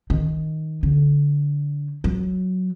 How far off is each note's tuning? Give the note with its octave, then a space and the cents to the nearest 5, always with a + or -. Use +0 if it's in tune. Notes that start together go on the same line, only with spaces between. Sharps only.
D#3 +10
D3 -20
F#3 +0